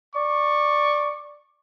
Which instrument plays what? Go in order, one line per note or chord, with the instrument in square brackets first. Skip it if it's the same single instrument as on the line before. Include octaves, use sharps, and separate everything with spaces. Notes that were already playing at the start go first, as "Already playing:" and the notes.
[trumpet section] D5 C#6